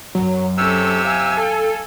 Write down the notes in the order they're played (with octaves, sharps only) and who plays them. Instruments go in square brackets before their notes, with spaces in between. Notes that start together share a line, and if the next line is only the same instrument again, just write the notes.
[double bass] F#2 [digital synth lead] F#3
[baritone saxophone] C3 [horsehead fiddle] C#4 A4 [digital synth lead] E6
[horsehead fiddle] F5 G#5
[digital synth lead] A4